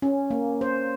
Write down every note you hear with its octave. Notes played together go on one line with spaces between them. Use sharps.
C#4
A#3
C5